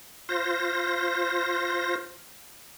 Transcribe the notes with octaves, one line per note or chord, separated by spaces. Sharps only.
F4 C5 A#6